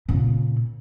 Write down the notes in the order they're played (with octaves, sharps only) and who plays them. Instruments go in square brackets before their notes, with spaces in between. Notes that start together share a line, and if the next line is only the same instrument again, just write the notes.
[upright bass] A#2 C#3